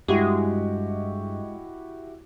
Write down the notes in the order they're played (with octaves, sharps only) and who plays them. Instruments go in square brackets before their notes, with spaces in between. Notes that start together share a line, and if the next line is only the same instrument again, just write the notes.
[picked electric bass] G2 [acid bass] G#3 [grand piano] E4 F#4 G4